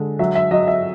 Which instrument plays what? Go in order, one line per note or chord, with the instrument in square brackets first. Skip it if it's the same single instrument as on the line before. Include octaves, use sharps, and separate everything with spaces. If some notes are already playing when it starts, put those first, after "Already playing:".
Already playing: [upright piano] D3 G#3
F#3 E5
E5
F#3 D#5
E5